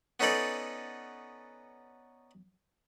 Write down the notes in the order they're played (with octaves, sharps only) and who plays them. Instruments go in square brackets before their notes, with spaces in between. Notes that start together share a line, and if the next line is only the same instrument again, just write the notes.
[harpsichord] B3 C#4 D#4 A4 B4 D5